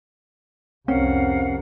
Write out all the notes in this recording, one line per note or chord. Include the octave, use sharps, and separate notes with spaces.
C2 F2 C4 C#4 A#4 F5 F#5